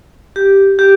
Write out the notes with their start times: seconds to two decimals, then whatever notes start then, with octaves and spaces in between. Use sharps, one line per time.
0.36 G4
0.79 G4